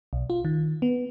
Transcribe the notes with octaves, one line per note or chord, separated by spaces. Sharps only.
B1
F4
D#3
B3